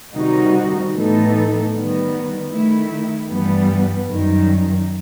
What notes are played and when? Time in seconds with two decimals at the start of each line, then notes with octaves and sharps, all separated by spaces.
0.15 C3 D#3 G3 D#4 F#4
0.94 A2 E3 B3 D#4 A4
1.72 D#3 G3 B3
2.51 D#3 A3 E4
3.30 G2 E3 G3 B3
4.09 F#2 D#3 G3